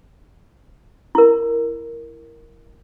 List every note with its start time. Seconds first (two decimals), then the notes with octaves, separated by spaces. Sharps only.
1.15 E4 A#4